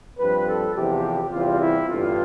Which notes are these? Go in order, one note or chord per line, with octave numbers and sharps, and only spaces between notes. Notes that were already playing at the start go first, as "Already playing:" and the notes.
G2 F3 C4 B4
A4
E2 C3 F3 G4
E2 C3 G3 C4 F4
E4
A1 G2 D3 G3 F4